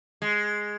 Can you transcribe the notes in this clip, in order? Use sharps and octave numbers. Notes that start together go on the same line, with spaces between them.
G#3